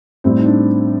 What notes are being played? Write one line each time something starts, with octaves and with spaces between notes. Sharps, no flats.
A2 G3 C4
D#4
D4